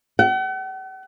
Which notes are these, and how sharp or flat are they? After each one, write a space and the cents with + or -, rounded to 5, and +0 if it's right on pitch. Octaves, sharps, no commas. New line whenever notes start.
F#5 +45